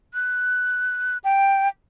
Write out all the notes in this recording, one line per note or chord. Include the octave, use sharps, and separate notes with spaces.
F#6
G5